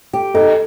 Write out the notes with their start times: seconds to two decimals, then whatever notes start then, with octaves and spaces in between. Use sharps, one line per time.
0.13 G4
0.34 D#4 A4